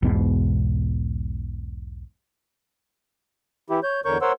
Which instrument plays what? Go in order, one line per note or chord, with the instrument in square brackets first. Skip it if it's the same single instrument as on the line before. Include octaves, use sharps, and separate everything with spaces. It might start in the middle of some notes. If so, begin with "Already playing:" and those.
[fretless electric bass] B1 E2 G#2 B2
[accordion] E3 E4 G4
C#5 G6
E2 D3 A#4 C#5 C#6 G6
A#4 C5 C#5 F#5 C6 E6